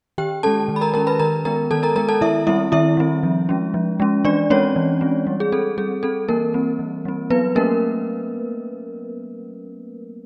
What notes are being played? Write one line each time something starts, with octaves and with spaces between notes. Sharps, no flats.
D#3 G4 G5
G#3 C#4 A4 A5
D#3
B5
A#4 A#5
G#3 C#4 A#4 A#5
B4 B5
D#3 A#4 A#5
G#3 B3 A#4 A#5
D#3 A4 A5
A#4 A#5
G#3 B3 A#4 A#5
A4 A5
D#3 E4 E5
G3 C4 E4 E5
D#3 E4 E5
G3 C4
F3
G#3 C#4
F3
G#3 C#4
E3 D4 D5
G#3 C4 C#4 C#5
E3
G#3 C4
G3
G#4
C4 A4
G3 G#4
C4 A4
E3 A#3 A#4
G3 C4
E3
G3 C4
F#3 B3 B4
A3 A#3 C#4 A#4